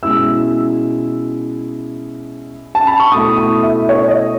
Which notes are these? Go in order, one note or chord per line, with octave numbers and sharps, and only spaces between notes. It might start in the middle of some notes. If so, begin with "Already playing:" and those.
B2 G#3 C#4 E4 E6
A5
B5
C#6
B2 A3 E4 D#6
D#6
E5
C#5
D#5